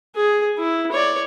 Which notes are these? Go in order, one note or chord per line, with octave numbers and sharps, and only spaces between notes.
G#4
E4
C#5 D5